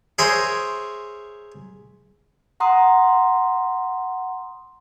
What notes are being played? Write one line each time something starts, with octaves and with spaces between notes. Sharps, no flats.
G#4 A#4 C5 C#5 E5
F#5 A#5 C6 D#6